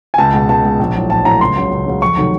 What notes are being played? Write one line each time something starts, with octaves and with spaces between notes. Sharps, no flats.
G#5
C#2 A5
B2 G#3
C#2 A5
B2 G#3
A#1
A2 F#3
A#1 A5
A2 F#3 A#5
C#2 C6
C#3 F#3
C#2
C#3 F#3
F2 C#6
C3 D#3 F#3 A3